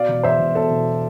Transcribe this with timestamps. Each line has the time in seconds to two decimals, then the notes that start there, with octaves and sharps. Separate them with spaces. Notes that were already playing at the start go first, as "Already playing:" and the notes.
Already playing: B2 D5 F5
0.09 E1
0.23 E2 C5 E5
0.39 E1
0.55 B2 A4 C5
0.70 E1